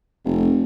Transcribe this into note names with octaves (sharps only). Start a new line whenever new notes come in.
F1